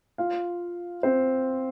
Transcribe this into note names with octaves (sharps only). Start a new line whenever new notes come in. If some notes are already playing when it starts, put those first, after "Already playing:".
F4 F5
C4 C5